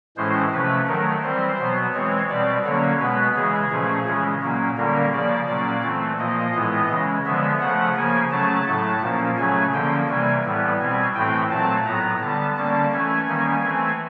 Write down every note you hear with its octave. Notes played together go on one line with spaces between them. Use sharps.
A2 E3 G#3 C#4 C5
C3 F3 A3 C#4 B4
D#3 F#3 A3 A#4
E3 G3 C4 C5
B2 F#3 B3
E3 G#3 C4 C#5
B2 G3 C4 D5
D3 F#3 A#3 C#4 C#5
B2 G#3 B3 B4
C#3 E3 G#3 G#4
A#2 F3 A3 C#4
C#3 E3 G#3 C#4
A#2 F#3 A#3 C#4
D3 G3 A#3 C#4 A#4
C#3 F3 A#3 D5
A#2 F#3 A#3 C#4
E3 A3 C4
A#2 F3 A#3 D#5
A2 E3 G#3 B3
C#3 E3 G#3 C#4
D3 F3 G#3 B3 E5
C#3 F3 A3 F#5
C#3 F3 A#3 G#5
C#3 F#3 A3 C#4 A5
A2 F#3 A3
A#2 F3 A#3 C#4
C#3 F#3 A3 C#4 G#5
D3 F3 A#3 C#4 G5
C3 E3 G3 A#3 G#5
A2 E3 G3 B3
B2 G3 C4 G#5
A2 E3 A3 C4 G5
A#2 F#3 A3 C4 A5
A2 F#3 B3 A#5
D3 G3 B3 A5
D3 G3 A#3 C#4 A5
E3 A3 C#4 G#5
D#3 G3 A#3 C#4
E3 A3 C4